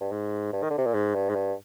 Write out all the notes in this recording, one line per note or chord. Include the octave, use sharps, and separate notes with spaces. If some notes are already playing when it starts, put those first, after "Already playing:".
G2
G#2
G2
D#3
D3
C3
A#2
G#2
G2
G#2
G2